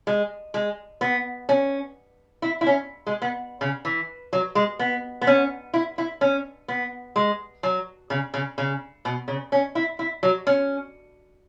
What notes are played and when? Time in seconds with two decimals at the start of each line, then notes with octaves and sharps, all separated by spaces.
0.07 G#3
0.54 G#3
1.01 B3
1.49 C#4
2.42 E4
2.61 E4
2.66 C#4
3.07 G#3
3.22 B3
3.61 C#3
3.85 E3
4.33 F#3
4.55 G#3
4.79 B3
5.21 B3
5.27 C#4
5.74 E4
5.98 E4
6.21 C#4
6.68 B3
7.16 G#3
7.63 F#3
8.10 C#3
8.34 C#3
8.58 C#3
9.05 B2
9.28 C#3
9.52 C#4
9.75 E4
9.99 E4
10.23 F#3
10.47 C#4